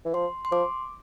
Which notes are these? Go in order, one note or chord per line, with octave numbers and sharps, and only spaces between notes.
E3
F3 C6
C6
F3 D6